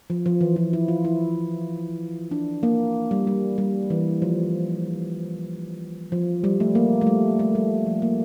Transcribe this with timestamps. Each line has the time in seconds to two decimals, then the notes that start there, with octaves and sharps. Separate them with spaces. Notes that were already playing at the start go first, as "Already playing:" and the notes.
0.10 F3
0.26 F3
0.41 E3
0.56 F3
0.73 E4
0.88 F4
1.05 E4
2.31 D4
2.63 A#3
3.11 G3
3.27 G3
3.58 G3
3.90 E3
4.22 F3
6.12 F3
6.44 G3
6.60 A3
6.75 A#3
7.01 A3
7.07 G3
7.39 A3
7.55 G3
7.86 F3
8.02 A#3